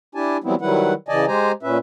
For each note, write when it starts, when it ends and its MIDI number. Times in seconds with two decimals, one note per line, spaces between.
0.15 0.37 62
0.15 0.37 64
0.15 0.37 67
0.15 0.37 80
0.15 0.37 81
0.44 0.55 52
0.44 0.55 54
0.44 0.55 55
0.44 0.55 59
0.44 0.55 60
0.44 0.55 64
0.61 0.93 51
0.61 0.93 54
0.61 0.93 55
0.61 0.93 64
0.61 0.93 71
0.61 0.93 78
1.09 1.25 49
1.09 1.25 52
1.09 1.25 74
1.09 1.25 75
1.09 1.25 80
1.09 1.25 81
1.28 1.52 56
1.28 1.52 67
1.28 1.52 72
1.28 1.52 80
1.28 1.52 82
1.63 1.78 46
1.63 1.78 61
1.63 1.78 71
1.63 1.78 76